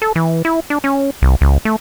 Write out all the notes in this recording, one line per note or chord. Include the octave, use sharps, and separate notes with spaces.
A4
E3
E4
D4
C#4
C2
C#2
A3